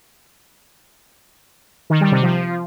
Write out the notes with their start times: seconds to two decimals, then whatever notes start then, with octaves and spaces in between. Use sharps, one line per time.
1.90 D#3
2.01 G3
2.12 C3
2.22 F3